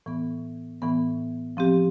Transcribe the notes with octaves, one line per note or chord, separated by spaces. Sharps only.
A2 E3 B3
A2 E3 B3
F3 C4 G4